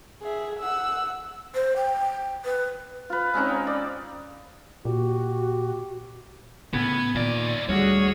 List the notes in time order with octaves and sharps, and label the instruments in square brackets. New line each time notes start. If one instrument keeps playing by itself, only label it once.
[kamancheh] G#4 E5
F#5 E6
[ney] C5
G5
B4
[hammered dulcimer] F4 B4
G#3 C4 C#4 D#4
G5
D5
[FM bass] A#2 [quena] F#4 [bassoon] G4
[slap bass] A2 C#3 [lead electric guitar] B3 [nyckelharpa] G#5
[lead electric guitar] D#2 D5 [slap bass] A#2 D#3
[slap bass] D2 [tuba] G3 [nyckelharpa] F#4 G#4 [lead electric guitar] C#5